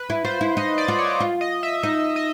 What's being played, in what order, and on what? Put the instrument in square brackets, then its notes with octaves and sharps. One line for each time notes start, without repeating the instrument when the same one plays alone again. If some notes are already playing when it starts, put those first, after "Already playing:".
Already playing: [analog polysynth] B4
[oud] E4
[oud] F4 [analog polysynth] C5
[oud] E4
[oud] D#4 [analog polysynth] D#5
[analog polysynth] D5
[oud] F4
[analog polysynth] C#5
[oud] F4
[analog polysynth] D#5
E5
[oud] D#4 [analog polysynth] D#5
[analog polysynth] D#5